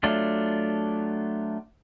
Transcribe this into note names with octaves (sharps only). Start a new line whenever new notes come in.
F#3 A3 D4 F4